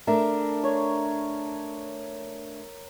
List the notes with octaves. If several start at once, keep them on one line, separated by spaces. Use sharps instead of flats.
A3 D4 A#4 E5
C#5